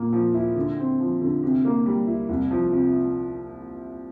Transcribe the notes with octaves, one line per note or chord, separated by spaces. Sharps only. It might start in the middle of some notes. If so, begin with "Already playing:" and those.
Already playing: A#2 A#3
F3
E4
D3
C4
F3
D3
C3
A#3
G3
E4
C2
F3
C3